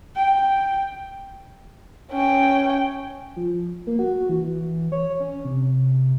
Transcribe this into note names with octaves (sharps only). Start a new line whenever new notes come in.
G5
C#4 G5
F3
A#3
F#4
E3
C#5
C#4
C3